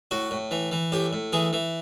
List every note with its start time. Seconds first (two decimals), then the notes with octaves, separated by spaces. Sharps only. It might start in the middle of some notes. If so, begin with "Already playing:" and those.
0.11 A2 F#4
0.31 A2
0.51 E3
0.72 E3
0.92 A2 G4
1.13 A2
1.33 E3 G#4
1.53 E3